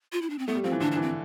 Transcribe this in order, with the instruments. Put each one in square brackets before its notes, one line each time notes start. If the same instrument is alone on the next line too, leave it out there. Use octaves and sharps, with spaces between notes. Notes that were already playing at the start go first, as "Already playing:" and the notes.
[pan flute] F4
E4
D4
C4
[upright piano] A3 [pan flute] B3
[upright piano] G3
[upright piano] F3 [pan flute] C4
[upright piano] E3
[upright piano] D3 [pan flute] D4
[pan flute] D4
[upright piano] E3
[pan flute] C4